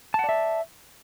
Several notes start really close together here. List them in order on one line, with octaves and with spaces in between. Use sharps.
A5 F#5 D5 E5